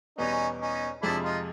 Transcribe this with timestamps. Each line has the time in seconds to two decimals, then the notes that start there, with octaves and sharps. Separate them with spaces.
0.18 E2 B2 G3 B3 C#4 D#4
0.60 C#4 D#4
1.02 F2 C3 F3 G#3 D4 E4
1.23 D#4 F4